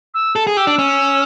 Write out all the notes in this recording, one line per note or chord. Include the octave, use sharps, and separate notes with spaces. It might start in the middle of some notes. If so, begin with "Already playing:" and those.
E6
A4
G#4
G4 E6
D4
C#4